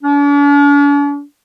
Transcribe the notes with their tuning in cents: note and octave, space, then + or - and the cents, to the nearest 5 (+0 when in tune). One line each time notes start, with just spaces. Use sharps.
D4 -45